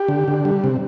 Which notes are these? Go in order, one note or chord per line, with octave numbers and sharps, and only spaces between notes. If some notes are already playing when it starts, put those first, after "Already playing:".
Already playing: G4
D3
D3
G3
C3